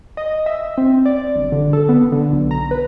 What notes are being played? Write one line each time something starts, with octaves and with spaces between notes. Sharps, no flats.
D#5
E5
C4
D5
G1
D3
A4
B3
D3
B1
A#5
B4